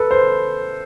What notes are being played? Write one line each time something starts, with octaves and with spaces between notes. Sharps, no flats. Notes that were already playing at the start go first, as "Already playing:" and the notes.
Already playing: A4 B4
C5